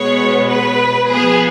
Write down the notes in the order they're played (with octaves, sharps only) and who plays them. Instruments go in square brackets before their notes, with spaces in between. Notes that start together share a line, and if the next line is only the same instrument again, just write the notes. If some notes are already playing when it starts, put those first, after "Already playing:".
Already playing: [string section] B2 G#3 B3 C#5
B4
F3 B3 G#4